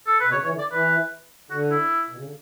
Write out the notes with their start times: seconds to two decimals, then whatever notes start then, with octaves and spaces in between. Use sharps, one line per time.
0.07 A4
0.20 B2 B4
0.31 C#3 C#5
0.42 E3 C#5
0.52 D3
0.59 D5
0.72 E3 B4
1.50 D3 F#4
1.71 E4
2.09 B2
2.16 C#3
2.23 D3